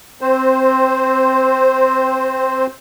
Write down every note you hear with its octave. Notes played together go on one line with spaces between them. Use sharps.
C4 C5